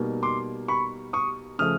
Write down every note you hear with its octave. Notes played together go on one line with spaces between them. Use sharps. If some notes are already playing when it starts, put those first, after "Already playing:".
Already playing: B2 G3 A#3 D#4
C6 D6
B5 C#6
C#6 D#6
C#3 F3 A3 D#6 F6